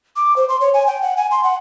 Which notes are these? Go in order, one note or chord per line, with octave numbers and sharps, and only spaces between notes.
D6
C5
C6
C#5
G#5
G5
F#5
G#5
C6
F#5